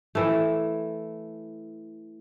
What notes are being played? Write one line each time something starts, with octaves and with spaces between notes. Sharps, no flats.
E3 A3